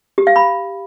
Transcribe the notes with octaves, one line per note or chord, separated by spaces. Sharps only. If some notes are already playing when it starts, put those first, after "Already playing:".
G4
F5
B5